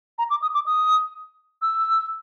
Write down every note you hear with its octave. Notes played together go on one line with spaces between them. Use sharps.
A#5
D6
D#6
D6
D#6
E6